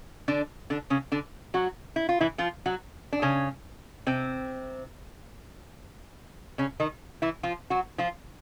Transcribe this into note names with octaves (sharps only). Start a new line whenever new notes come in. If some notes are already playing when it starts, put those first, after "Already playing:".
D3 D4
D3 D4
C#3 C#4
D3 D4
F#3 F#4
E4
F4
E3 E4
F3 F4
F#3 F#4
D4
C#3 C#4
C3 C4
C#3 C#4
D#3 D#4
E3 E4
F3 F4
F#3 F#4
F3 F4